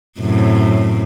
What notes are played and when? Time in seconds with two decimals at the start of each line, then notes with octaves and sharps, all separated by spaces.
0.20 F#2 A2 C3